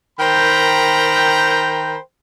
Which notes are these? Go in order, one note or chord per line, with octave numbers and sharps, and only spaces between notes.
D#3 A#4 C5 G5 A#5 B5